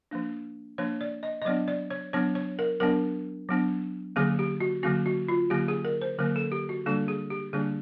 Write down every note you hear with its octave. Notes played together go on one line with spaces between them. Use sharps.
F3 A#3 D4
F3 A#3 D4 C#5
D5
D#5
D#5
F#3 B3 D4 D5
D5
C#5
F#3 B3 D4 C#5
C#5
A#4
F#3 B3 D4 A#4
F#3 B3 D4
D3 F#3 A#3 C#4 G#4
G4
F#4
D3 F#3 A#3 C#4 F#4
F#4
F4
D3 F#3 A#3 C#4 G4
G#4
A#4
C5
D3 F#3 A#3 C#4 A#4
A4
G4
F#4
D3 G3 A#3 D4 A4
G#4
G4
D3 G3 A#3 D4 G#4